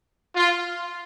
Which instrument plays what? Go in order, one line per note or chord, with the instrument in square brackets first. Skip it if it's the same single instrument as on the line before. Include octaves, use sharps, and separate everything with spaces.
[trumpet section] F4